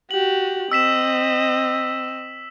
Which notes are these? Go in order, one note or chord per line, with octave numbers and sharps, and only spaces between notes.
F#4 G4 F#7
C4 D#5 E6 B6 E7